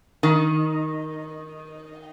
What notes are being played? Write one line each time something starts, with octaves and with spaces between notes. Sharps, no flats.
D#3